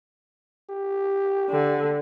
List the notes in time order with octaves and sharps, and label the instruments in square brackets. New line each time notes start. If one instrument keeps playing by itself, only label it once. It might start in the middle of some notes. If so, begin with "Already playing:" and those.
[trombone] G4
[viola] D3